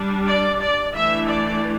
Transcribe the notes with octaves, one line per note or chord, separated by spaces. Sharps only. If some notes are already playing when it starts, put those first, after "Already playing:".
Already playing: G3 D4
D5
D5
E3 A3 D4 E5
D5